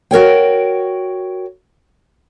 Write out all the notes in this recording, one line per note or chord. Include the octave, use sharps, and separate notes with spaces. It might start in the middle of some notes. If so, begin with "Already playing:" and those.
F#4 A#4 C#5 G5